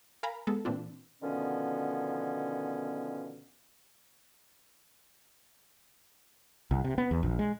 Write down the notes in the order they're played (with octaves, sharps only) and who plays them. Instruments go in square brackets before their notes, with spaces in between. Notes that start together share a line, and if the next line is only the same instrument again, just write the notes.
[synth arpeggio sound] A#4 F5 G#5 A#5 B5
G#3 B3 A4
A#2 E3 C4 D4 F4
[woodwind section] B2 D3 D#3 F3 B3 C#4
[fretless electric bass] C2
C3
B3
E2
A#1
G#3